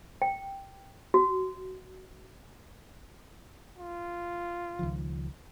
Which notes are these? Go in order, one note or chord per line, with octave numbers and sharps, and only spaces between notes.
G5
F#4
F4
C#2 D#3 F3